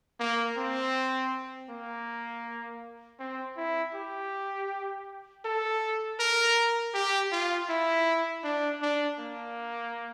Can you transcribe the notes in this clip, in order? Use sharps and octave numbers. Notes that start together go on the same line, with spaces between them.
A#3
C4
A#3
C4
E4
G4
A4
A#4
G4
F4
E4
D4
D4
A#3